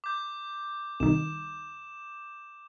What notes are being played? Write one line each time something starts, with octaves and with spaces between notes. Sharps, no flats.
D6 G6
C2 D#3 E7